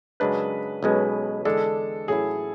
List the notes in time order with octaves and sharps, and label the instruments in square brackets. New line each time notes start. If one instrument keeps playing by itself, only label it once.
[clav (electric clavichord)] F#2 C#3 G#3 D4 [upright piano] B4
[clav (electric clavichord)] B1 B2 G#3 C#4
[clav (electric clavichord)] E2 D3 G#3 D4 [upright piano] A4
[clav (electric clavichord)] A1 A2 F#3 C#4 E4 [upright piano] G#4